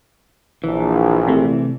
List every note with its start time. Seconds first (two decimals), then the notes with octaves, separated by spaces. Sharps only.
0.64 A#1 E3
1.27 C3 A3